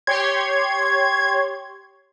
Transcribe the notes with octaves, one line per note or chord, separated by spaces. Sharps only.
G4 C#5 C6 G#6